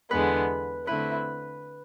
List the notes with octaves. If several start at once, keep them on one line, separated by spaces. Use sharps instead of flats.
E2 D3 G#3 B3 B4
D3 A3 C4 E4 B4